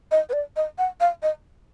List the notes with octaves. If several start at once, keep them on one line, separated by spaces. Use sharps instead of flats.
D#5
B4
D5
D#5
F#5
F5
D#5